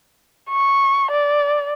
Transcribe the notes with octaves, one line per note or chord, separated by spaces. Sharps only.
C#6
D5